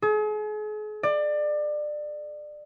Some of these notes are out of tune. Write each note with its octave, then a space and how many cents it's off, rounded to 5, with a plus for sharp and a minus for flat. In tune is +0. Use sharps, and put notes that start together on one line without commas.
G#4 +40
D5 +25